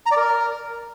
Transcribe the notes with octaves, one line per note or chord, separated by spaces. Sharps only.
A#5
D5
A#4